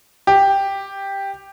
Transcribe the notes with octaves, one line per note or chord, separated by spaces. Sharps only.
G4